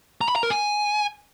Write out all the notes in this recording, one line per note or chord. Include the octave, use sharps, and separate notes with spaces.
A#5
B5
A#5
A#4
G#5